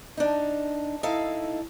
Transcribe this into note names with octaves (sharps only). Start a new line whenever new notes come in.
D4 D#4
D#4 E4 A4 F5